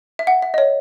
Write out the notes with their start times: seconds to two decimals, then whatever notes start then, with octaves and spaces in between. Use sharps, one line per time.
0.19 E5
0.27 F#5
0.42 E5
0.54 D#5
0.58 C#5